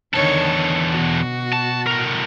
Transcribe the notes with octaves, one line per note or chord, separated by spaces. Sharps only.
E2 D3 D#3 A4 C#5
B2 F#4
A5
A2 A#4